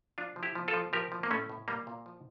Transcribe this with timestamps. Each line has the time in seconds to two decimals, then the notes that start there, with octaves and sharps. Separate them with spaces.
0.18 F3 D4 F4
0.36 F3
0.43 E4 G4
0.55 F3
0.68 F4 A4
0.74 F3
0.93 F3 G4 A#4
1.12 F3
1.23 A#3
1.31 A2 A3 C#4
1.50 A2
1.68 A#2 G3 A#3
1.87 A#2
2.06 F3